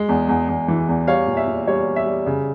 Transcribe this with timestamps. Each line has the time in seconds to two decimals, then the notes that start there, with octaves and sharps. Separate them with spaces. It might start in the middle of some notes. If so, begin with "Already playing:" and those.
Already playing: G#3
0.09 E2
0.28 E2
0.49 E2
0.68 E3
0.89 E2
1.07 G3 C#5 F5
1.27 A#2
1.37 E5
1.47 A#2
1.68 G3 C#5
1.87 G3
1.96 E5
2.06 G3
2.26 C#3